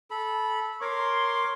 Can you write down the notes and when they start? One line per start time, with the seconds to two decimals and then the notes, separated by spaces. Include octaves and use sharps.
0.11 A4 B5
0.82 A#4 C#5 C6 D6